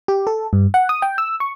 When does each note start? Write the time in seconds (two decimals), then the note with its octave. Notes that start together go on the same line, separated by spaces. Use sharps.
0.08 G4
0.27 A4
0.53 G2
0.74 F#5
0.89 D#6
1.02 G5
1.18 E6
1.40 C#6